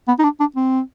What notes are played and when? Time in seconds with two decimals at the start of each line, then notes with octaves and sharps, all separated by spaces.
0.08 B3
0.19 D#4
0.24 D4
0.40 D4
0.56 C4